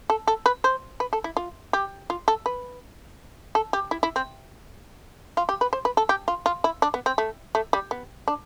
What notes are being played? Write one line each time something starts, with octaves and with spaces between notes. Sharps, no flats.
A4
A4
B4
C5
B4
A4
E4
F4
G4
F4
A4
B4
A4
G4
E4
E4
C4
F4
G4
B4
C5
B4
A4
G4
F4
F4
E4
D4
B3
C4
A3
A3
G3
B3
D4